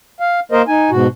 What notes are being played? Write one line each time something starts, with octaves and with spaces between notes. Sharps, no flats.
F5
A#3 A#4 C5 D#5
D#4 G#5
G#2 B2 F#4